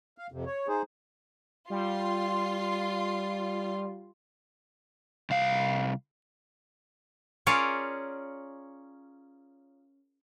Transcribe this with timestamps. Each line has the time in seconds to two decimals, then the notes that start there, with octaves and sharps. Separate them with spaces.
0.18 F5
0.32 F2 C3
0.46 C#5
0.68 D#4 G#4 C5
1.70 G3 F4 C6
5.30 C2 F5
7.47 C#4 F4 G#4 A#4 C#5 D5